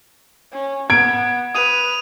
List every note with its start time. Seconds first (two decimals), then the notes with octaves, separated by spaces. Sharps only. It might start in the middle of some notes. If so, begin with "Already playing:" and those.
0.52 C#4
0.90 B3 G#6 D7
1.55 B4 D#6 D#7 F7